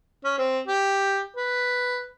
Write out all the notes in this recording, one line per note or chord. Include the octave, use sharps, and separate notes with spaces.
C#4
C4
G4
B4